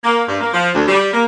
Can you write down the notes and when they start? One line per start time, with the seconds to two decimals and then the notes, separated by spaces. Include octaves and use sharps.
0.04 A#3
0.27 G2
0.41 A#3
0.53 F3
0.75 D2
0.88 G3
1.12 A#3